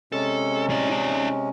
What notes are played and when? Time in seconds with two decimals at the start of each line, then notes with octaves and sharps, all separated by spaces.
0.12 C3 G#3 C#4 A4
0.69 A2 D5
0.89 D#4 D5